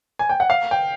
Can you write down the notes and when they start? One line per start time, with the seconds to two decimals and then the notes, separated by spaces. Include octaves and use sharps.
0.19 G#5
0.29 G5
0.40 F#5
0.50 F5
0.71 G5